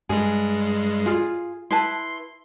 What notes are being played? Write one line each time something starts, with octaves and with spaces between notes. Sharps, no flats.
G2 G#3 G#4
F4 G#4
E4 B4 A5 C6